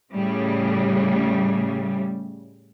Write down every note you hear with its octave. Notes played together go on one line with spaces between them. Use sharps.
A2 C#3 G3